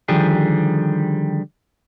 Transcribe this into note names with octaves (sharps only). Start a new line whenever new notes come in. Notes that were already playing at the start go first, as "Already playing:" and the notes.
D3 D#3 F3 G3 G4 G#4